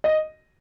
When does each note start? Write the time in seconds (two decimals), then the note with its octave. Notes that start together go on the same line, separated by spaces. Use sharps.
0.04 D#5